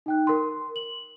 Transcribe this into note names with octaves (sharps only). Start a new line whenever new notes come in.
D#4 G5 F#6
A#4 C6
F#7